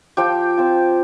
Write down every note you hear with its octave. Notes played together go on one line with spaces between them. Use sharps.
F3 G4 G5
C4 F4